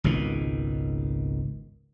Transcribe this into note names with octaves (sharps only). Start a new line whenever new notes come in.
G#1 C#2 B2 D#3